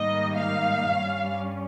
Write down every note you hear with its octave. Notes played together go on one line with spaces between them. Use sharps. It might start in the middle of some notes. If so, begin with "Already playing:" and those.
Already playing: G#2 D#3 G3 A#3 D#4 D#5
F5
G2 G3 C#4